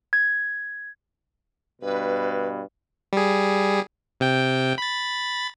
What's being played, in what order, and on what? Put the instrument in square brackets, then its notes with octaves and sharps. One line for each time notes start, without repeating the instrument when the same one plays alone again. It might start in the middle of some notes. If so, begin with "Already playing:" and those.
[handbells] G#6
[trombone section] G2 B2 [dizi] B4
[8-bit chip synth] G3 G#4
C3 G5
B5 A6